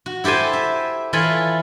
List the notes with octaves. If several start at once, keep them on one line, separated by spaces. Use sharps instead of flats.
F#4
E4 G4 A4 C5 G#5
E5
E3 F4 A4 C#5 G#5 B5